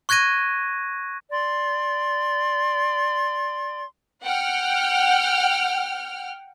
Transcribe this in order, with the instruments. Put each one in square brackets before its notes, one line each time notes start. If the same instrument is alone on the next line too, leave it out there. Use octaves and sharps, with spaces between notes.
[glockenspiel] C#6 F#6 G#6 A#6 D#7
[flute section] D5 C6
[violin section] F#5 G5 F6